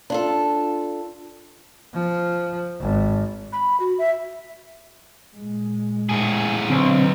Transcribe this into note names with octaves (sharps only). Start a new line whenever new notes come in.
D4 F4 A4
F3
G#1
B5
F#4
E5
A#2 G#3
A2 G#4
B1 D3 C4